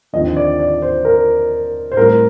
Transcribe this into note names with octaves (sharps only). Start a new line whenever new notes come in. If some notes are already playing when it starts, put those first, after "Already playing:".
D#2 D3 F3 C4 D#4 D#5
D5
D5
C5
A#4
C5
A2 G3 C4 A#4